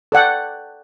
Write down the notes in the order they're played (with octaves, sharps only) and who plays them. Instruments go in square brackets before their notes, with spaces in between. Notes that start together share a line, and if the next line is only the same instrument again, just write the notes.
[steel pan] A4 D5 F#5 G5